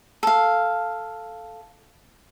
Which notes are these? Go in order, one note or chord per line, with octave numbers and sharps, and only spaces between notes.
A4 F5